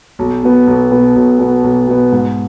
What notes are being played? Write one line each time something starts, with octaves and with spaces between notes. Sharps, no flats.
B1
B2 B3
B1
B2 B3
B1
B2 B3
B1
B2 B3
G#2